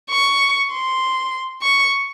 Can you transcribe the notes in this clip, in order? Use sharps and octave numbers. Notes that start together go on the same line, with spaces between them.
C#6
C6
C#6